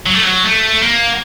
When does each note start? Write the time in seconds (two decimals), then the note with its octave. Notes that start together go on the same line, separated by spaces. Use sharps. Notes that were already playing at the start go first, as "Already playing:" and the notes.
0.06 F#3
0.14 A3
0.23 F#3
0.44 A3
0.83 A#3